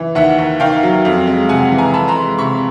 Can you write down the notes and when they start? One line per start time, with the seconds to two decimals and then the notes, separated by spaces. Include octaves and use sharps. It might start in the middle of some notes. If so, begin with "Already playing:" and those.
Already playing: E3
0.15 D#2 E5 F#5
0.38 D#2
0.60 D#3 F5 G5
0.83 F#3
1.05 F2
1.27 G#3
1.49 C3 F#5 G#5
1.72 E3
1.78 G#5 A#5
1.94 F2 A5 B5
2.08 A#5 C6
2.15 G#3
2.38 C3 B5 C#6